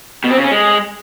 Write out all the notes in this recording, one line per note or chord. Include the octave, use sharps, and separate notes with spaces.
B2
C4
C#3
C#4
G#3